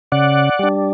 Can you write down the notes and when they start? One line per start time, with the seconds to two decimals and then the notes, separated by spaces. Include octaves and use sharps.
0.12 C#3 D5 F#5
0.59 G3 D4